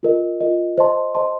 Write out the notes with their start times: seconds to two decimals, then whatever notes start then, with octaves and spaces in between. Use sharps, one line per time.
0.03 F4 A#4 D#5
0.41 F4 A#4 D#5
0.78 C5 D#5 A5 C6
1.15 C5 D#5 A5 C6